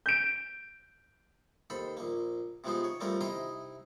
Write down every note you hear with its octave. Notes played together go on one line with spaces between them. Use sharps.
G6 D7
D#2 A4 C5 B5
A#1 A#3
C3 F3 G#3 B3 D#4 C5
C#5
F3 G3 A3 C4 C#4 A#4
C3 D#4 E4 D#5 A#5 C6